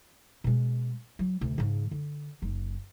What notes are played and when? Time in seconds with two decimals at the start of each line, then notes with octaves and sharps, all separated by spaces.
0.44 B2 G#3
1.19 F#3
1.41 D2 C3
1.58 G#2 C#3
1.91 D3
2.42 F#1 D#4